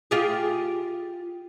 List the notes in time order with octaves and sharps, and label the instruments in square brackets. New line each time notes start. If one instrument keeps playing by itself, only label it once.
[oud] F4 G4 G#4